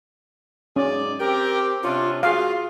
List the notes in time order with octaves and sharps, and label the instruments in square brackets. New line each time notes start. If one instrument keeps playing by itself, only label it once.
[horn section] G#2 G#4 D5 [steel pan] C#4
[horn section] C4 G4 [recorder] A#4
[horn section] C3 C#4 D4 [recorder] F4
[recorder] F4 [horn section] F#4 [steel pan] G#4 F5